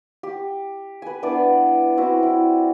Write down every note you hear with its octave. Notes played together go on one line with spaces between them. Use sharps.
G4
B4 G#5
B3 D4 E4 D5
C4 E4 F#4
E4